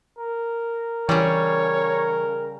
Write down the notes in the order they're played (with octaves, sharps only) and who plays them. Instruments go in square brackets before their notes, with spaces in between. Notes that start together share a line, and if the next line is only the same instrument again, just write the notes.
[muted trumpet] A#4
[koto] C#3 G3 [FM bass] E3 [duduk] C#5